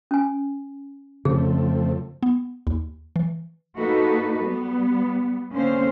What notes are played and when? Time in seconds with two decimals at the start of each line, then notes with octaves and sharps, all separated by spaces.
0.11 C#4 G#5
1.25 F2 C#3 A3 C4 G#4
2.23 B3
2.67 D#2
3.16 E3
3.76 A#3 D#4 F#4 A4 B4
4.43 G3 B3
5.53 D3 A#3 C4 C#4 C5 F5